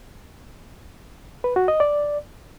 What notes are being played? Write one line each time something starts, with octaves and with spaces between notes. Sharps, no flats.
B4
F#4
D#5
D5